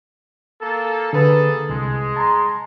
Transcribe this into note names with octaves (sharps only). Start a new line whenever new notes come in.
A#3 A4
D3 A#3 G#4 A4 B4
C2 G#3
A5 A#5 C6